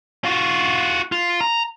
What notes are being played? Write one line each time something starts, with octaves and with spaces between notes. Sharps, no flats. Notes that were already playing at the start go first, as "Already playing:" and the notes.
F4 F#4
F4
A#5